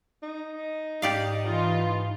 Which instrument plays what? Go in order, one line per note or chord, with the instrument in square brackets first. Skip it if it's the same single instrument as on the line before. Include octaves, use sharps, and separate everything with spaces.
[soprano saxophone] D#4
[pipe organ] G#2 [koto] G4 D5 F5
[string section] E3 F4